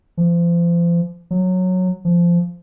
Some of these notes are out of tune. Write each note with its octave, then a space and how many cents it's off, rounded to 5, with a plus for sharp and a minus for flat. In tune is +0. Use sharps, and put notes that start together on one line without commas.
F3 -35
F#3 -10
F3 -15